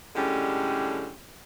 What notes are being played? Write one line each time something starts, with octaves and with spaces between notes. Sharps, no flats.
A2 D3 G3 G#3 C#4 G4